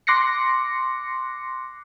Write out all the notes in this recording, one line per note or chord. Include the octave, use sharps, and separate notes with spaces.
C6 D6 F#6 A#6 C7 C#7